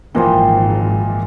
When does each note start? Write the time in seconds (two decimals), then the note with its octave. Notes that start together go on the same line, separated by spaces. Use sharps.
0.15 G#1 A#2 E3 F3 D#4 C5 G5